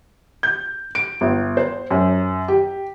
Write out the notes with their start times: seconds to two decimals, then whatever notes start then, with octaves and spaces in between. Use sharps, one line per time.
0.43 G6
0.95 D7
1.21 G1
1.57 C5
1.91 F#2
2.48 G4